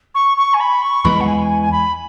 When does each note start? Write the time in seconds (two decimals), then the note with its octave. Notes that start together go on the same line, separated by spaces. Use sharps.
0.15 C#6
0.37 C#6
0.54 G#5
0.60 B5
0.82 C#6
1.05 E2 E3 G#3 B5
1.21 F#5
1.27 G#5
1.49 G#5
1.62 G#5
1.72 B5